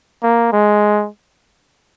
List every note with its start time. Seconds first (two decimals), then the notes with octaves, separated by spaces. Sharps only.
0.23 A#3
0.52 G#3